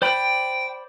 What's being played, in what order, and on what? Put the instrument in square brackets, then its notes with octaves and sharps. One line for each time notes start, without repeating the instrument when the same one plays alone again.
[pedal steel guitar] C5 D5 B5 [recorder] G5